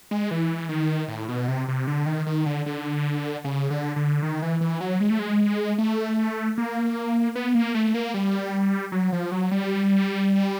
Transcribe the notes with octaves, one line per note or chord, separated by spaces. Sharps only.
G#3
E3
D#3
A2
B2
C3
C3
D3
D#3
D#3
D3
D3
C#3
D3
D3
D#3
E3
E3
F#3
G#3
A3
G#3
A3
A#3
B3
A#3
A3
A#3
G3
F#3
F3
F#3
G3